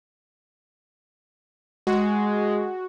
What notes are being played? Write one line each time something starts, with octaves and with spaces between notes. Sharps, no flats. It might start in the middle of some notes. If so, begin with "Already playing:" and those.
G#3 F#4